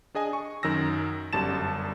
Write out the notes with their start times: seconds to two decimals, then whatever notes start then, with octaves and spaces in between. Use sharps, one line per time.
0.15 D4 G#4 D#5 G#5
0.33 C#6
0.63 F#2 D#3 F#3 E6 A#6
1.33 G1 F#2 G3 A5 A6 E7